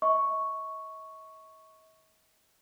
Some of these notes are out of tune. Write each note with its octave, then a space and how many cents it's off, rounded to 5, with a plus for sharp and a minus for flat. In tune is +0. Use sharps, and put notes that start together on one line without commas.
D#5 +45 C#6 +0